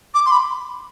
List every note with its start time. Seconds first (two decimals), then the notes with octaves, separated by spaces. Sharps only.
0.14 D6
0.26 C6
0.31 B5